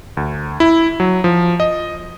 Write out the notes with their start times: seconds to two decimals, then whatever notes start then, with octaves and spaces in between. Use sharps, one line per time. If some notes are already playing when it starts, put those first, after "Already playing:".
0.17 D2
0.60 E4
1.00 F#3
1.24 F3
1.60 D#5